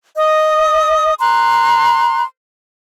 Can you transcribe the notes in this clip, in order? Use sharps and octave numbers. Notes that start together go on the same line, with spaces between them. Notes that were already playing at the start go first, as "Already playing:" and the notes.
D#5 D#6
A#5 C6 F#6